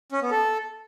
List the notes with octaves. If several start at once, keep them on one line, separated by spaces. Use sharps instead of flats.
C#4
B3
A4